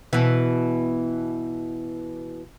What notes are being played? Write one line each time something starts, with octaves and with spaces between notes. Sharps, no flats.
B2 E3